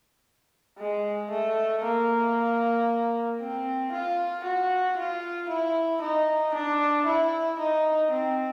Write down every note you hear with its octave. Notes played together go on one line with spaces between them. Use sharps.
G#3
A3
A#3
C4
F4
F#4
F4
E4
D#4
D4
E4
D#4
C4